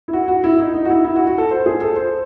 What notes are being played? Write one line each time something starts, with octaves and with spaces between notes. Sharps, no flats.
E4
F#4
F#4
E4
D#4
D#4
F#4
E4
E4
F#4
F#4
A4
C5
G#4
A4
C5